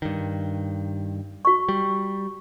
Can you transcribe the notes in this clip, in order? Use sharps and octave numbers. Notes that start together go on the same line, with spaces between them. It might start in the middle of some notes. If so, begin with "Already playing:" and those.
G2 D#3
F#4 C#6
G3